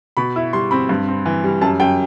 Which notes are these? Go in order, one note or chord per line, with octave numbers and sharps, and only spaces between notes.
B2 B5
E4
G3 C6
C4 B5
G2
C4
E3
G3
F#2 A5
F#2 G5